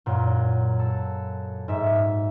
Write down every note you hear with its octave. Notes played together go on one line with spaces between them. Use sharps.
F#2 A#2
A4
G#2 E5